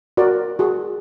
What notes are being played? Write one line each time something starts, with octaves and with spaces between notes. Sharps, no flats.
F#4 A#4 D5
F#4 G#4